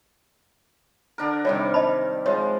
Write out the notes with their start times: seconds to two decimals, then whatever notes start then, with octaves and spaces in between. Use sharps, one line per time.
1.18 D3 D4 A#4
1.45 C3 D#3 G3 C#5
1.74 D#5 A5 B5
2.26 F3 G#3 C#5